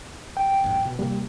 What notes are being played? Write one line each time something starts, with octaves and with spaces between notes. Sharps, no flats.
G5
A#1 G2
B2
C3 G3 A#3